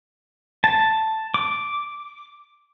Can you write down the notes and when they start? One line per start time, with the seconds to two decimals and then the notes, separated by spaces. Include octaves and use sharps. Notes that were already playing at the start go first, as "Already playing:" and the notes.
0.64 A5
1.34 D6